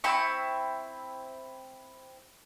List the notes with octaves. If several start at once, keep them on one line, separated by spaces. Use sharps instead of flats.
C4 E4 C#6